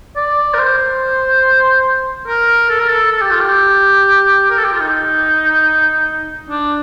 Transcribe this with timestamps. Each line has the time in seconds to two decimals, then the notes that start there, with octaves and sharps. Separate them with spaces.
0.16 D5
0.54 A#4
0.59 C5
2.27 A#4
2.70 A4
2.79 A#4
2.88 A4
3.12 A4
3.22 G4
3.31 F4
3.40 G4
4.50 A#4
4.57 A4
4.65 G4
4.73 F4
4.80 D#4
6.49 D4